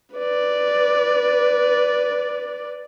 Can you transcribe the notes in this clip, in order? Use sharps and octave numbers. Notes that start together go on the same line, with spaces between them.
B4 D5